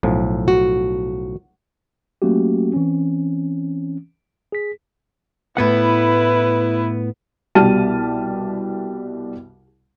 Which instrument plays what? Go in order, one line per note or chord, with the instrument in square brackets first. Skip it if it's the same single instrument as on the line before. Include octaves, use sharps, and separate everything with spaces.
[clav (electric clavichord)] B1 A2 F3
[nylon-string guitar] F#4
[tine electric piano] F#3 A3 A#3 C#4 F#4 G4
E3 C4 C#4
G#4 B6
[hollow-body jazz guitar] A2 B3 F#5 [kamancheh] E4 B4
[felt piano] C2 B2 G3 A5 F6 D#7